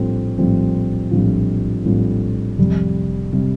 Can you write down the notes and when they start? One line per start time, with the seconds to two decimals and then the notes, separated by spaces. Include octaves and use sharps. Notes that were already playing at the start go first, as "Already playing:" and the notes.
Already playing: A#1 A2 G3 C4 F4
0.38 A#1 A2 G3 C4 F4
1.11 A#1 A2 G3 C4 F4
1.85 A#1 A2 G3 C4 F4
2.58 F1 F2 C3 G3
3.33 C3 G3